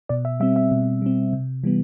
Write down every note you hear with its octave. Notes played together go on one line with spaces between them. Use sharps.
B2 D5
E5
G3 C4 E5
E5
B2
G3 C4
C3
E3 G3 B3